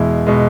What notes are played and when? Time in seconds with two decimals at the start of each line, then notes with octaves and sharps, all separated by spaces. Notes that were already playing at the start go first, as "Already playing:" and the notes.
Already playing: E2 B2 G#3 E4
0.27 B2 G#3